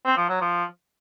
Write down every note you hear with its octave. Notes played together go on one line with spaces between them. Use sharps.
C4
F3
F#3
F3